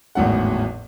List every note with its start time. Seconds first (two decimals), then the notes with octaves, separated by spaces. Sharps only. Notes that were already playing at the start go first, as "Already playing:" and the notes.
0.15 G#1 E2 A2 F#3 F#5